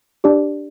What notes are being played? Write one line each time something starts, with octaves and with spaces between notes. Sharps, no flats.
D4 G4 D5